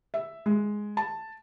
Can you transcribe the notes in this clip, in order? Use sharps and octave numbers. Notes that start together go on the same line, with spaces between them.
E5
G#3
A5